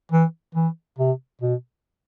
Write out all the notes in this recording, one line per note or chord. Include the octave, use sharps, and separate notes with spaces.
E3
E3
C3
B2